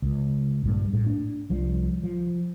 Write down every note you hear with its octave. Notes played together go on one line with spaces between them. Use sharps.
C#2
A#1 G2 A#2
A2
D4
C2 F3 G3
F3